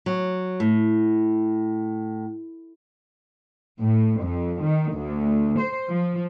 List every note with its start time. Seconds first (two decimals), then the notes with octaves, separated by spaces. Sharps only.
0.06 F#3
0.60 A2
3.81 A2
4.22 F2
4.63 D#3
4.93 D2
5.59 C5
5.90 F3